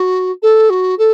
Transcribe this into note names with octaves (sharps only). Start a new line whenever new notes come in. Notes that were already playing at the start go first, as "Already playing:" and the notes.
Already playing: F#4
A4
F#4
A4